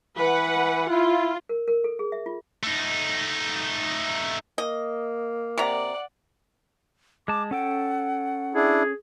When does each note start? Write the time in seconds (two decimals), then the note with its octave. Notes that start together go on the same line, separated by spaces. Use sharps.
0.18 E3 B4 F#5
0.90 E4 F4
1.49 A#4
1.68 A#4
1.84 A4
1.99 G#4
2.12 E5
2.26 F4
2.63 A3 D#4
4.58 A#3 D#5
5.58 C3 D5 F#5 A#5
7.28 G#3 A5 D6
7.51 C#4 A4 F#5 G5
8.55 D4 E4 G#4